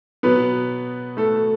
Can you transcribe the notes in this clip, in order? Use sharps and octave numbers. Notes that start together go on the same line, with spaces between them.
B2 F#3 B3 B4
A3 A4